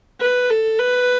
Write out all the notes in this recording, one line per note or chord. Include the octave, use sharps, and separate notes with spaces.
B4
A4
B4